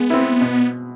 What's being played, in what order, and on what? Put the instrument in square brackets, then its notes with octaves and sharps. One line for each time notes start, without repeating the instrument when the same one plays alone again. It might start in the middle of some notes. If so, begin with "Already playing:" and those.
Already playing: [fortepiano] G#3 [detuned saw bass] B3
[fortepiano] C4 E4
B2